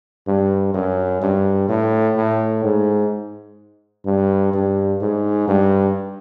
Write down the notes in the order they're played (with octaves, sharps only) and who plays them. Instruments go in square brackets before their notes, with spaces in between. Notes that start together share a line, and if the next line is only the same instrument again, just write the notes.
[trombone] G2
F#2
G2
A2
A2
G#2
G2
G2
G#2
G2